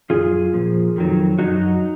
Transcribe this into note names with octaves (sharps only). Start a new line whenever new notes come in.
F#2 F3 F4 G#4
A#2 F3
F2 D#3 F#3
F#2 D#3 F#3 D#4 F#4